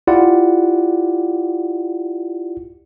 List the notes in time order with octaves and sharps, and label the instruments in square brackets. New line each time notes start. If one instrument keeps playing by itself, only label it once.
[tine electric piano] E4 F4 G4 D5 F#5